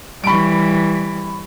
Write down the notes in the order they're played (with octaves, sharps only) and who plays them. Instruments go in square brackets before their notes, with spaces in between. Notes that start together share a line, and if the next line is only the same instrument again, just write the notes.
[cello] E3 G3 [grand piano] B5 C#6 D7